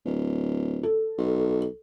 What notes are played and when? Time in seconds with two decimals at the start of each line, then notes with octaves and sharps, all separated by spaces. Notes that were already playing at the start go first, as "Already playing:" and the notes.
0.06 D1
0.83 A4
1.18 B1